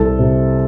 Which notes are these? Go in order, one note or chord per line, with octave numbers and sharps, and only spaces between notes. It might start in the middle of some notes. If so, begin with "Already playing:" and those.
Already playing: C2 A4
C3